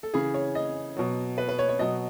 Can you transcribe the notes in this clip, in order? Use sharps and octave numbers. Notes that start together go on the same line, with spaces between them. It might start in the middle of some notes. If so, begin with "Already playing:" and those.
A4
C#3 E3 G#4
C#5
D#5
B2 F#3
B4
B4
C#5
C#5
B2 F#3 D#5